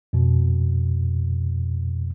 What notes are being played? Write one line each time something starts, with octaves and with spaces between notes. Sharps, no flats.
F2 B2